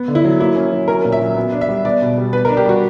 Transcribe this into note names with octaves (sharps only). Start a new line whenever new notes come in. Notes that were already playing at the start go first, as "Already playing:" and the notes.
Already playing: B3
D3
E4
F#3
A#3 E4
C#4
F#3
C#4 A#4
A#2
E5
F#3
B3
D4
E5
G3
B3 D5
B2
G3
B3 B4
A#4
D4
G4
G3 F#4